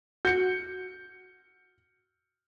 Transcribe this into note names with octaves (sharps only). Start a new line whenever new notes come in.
F#4 G6 C#7